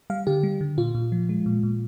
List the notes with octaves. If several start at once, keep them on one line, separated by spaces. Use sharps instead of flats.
G3 F5
D3 G4
G3
D3
A#2 F4
A#2
F3
G#3
A#2
A#2